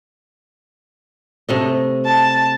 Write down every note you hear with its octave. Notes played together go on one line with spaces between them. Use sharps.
C3 A3 D#5
A5